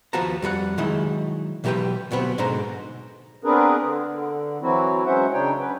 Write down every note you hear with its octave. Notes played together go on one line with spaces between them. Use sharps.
D#2 F3 B3 F#4 A5 A#5
F2 G3 A4 F#5
D#3 F#3 G#3 D#4 E4
B2 E3 F#3 G4 B4 G5
D2 B2 F#3 B3 C4
G#2 B2 D3 D#4 C5 A#5
B3 C4 D4 G#4 A#4 B4
D3
E3 F#3 C4 E4 F#4
F#3 G#3 C#4 C5 E5 F#5
C#3 D4 D#4 C#5 G5
C#4 B4